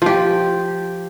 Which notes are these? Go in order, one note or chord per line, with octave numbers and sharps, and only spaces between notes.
F3 G4